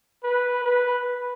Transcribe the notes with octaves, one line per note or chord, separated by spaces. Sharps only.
B4
B4